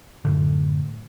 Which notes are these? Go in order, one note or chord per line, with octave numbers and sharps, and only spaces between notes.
F#2 A2 D3